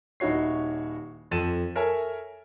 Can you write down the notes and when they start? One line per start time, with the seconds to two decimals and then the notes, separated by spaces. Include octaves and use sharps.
0.20 D#1 D#4 E4 F#4 C#5 C7
1.31 F2 A4 A6 D#7 E7
1.75 A4 A#4 C#5 E5 G#5